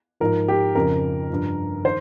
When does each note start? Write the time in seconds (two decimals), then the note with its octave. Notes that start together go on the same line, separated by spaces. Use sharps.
0.20 G#2 F3 A#4
0.48 G4
0.75 F2 C#3 F3 A#4
1.30 G2 F3
1.84 D#3 C5